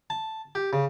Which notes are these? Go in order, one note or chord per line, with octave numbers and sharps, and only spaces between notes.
A5
G4
C#3